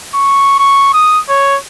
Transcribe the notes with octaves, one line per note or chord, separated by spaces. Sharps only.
C#6
C#6
D#6
C#5